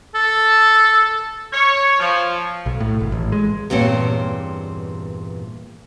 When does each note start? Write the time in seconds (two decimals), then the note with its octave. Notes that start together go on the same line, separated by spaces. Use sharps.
0.15 A4
1.53 C#5
2.00 F3
2.66 B1
2.80 A2
3.00 G#1
3.12 A1
3.32 G#3
3.70 E2 G2 A#2 C4 C#5